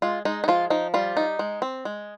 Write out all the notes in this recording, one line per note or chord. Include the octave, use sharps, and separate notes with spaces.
G#3 F4
G#3 D#4
D#4
F3 F4
F3 D#4
G3 F4
D#4
G#3
C4
G#3